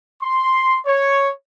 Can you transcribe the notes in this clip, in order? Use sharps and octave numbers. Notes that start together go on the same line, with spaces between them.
C6
C#5